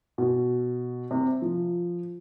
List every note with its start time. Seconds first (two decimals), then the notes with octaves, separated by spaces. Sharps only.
0.18 B2
1.11 C3
1.42 F3